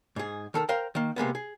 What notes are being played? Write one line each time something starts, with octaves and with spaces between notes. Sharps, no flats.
G#2 G#4
D#3 A4 A#4
A#4 C5 F5 G5
D#3 A#3
C3 G#3 A#3 B3
G#4